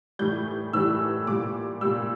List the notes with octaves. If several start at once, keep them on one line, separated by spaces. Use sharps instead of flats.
A2 E3 G3 G6
A2 E3 G3 E6
A#2 G3 D6
A#2 G3 E6